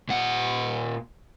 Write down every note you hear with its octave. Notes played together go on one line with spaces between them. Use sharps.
A#2 F#5